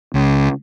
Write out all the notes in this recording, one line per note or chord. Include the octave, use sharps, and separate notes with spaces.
C#2